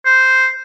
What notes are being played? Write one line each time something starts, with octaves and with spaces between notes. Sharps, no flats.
C5